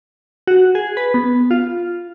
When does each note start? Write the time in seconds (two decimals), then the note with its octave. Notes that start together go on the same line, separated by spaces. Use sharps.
0.47 F#4
0.75 G#4
0.97 B4
1.14 B3
1.51 F4